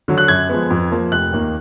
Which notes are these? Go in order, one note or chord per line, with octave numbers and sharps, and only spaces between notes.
D3 F#3
F#6
F#2 G#6
F3 G#3 B3
F2
F3 A#3
F1 F#6
D#2 D#3 A#3